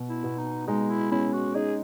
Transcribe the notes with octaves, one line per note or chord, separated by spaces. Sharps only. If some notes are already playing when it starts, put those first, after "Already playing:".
Already playing: B2
E4
B2
D#4
G#3 D#4
E4
C#4 E4
F#4
D#4 G#4